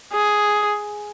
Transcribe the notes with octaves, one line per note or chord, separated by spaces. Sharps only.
G#4